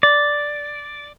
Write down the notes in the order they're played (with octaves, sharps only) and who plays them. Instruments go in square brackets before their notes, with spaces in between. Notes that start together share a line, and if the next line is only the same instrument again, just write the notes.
[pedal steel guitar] D5